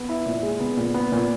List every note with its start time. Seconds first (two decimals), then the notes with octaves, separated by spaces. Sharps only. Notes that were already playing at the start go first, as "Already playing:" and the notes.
Already playing: B3
0.09 E4
0.26 A#2
0.43 G#3
0.60 B3
0.77 A#2
0.94 B3
1.12 A#2